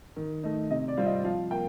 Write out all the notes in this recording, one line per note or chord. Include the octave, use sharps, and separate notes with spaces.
D#3
A3 D#4
C3 D#5
D5
G3 C4 F4 F5
D#5
F3 F5
A#3 G5